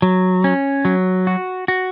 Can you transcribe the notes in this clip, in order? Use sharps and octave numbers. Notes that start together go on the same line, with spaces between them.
F#3
C#4
F#3
F#4
F#4